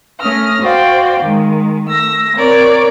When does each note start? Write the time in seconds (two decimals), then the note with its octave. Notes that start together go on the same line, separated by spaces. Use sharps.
0.20 A3 C#4 D#6 F6 A#6
0.62 F#4 C5 D5 F5 G5
1.20 D#3 G#3
1.86 A3 E6 A#6
2.36 C4 A#4 C#5 D5